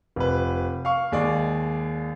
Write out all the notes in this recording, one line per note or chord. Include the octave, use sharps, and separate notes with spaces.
F1 B4
F5 C#6
D#2 G#3 D5